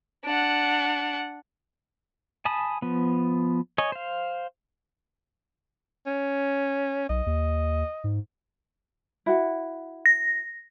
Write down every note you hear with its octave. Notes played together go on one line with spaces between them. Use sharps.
D4 F#5
G#5 A5 B5 D#6
F3 B3
C#5 D#5 G#5
C5 F5
C#4
B1 D#5
D#2
G#2
E4 F#4 F#5
A#6